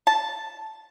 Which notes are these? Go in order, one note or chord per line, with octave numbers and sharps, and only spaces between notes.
A5